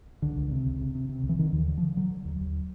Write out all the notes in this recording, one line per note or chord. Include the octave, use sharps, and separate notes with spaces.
C#2 D3
C#2
C3
C#2
C3
C3
C3
C#2
E3
D3 D#3
D#2
E3
D3
F3
D3
D3 F#3
D3
D#2
D#2